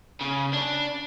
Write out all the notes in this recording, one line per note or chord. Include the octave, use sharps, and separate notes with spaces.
C#3
D4